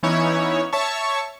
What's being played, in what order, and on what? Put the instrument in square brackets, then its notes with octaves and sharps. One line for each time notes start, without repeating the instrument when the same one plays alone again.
[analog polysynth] E3 B3 C#4 D#4 E4 C#5
C#5 E5 A5 C#6